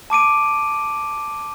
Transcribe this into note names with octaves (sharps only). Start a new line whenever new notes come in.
A5 D6 D7 D#7